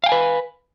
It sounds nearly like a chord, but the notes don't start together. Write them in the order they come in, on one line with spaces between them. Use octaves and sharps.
F5 G5 G#5 B4